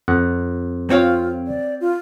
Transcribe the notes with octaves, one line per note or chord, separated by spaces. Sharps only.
F2 F#5
C4 F4 C#5 F5
D5
F4